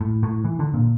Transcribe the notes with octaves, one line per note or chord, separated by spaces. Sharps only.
A2
A2
E3
D3
A#2